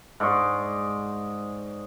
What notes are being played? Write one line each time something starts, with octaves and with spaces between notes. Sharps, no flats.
G#2 D5 C6 C#6